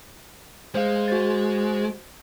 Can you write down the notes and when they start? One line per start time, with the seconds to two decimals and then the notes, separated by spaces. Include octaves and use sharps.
0.75 G#3 C5 F5
1.08 F#4 C5 A6